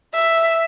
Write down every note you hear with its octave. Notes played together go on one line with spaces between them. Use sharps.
E5